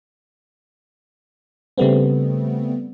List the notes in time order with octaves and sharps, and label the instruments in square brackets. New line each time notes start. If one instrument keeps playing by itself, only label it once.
[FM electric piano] C#3 G3 A3 B3 C4